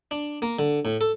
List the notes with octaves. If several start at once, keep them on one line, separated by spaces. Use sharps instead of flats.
D4
A#3
D3
A2
A4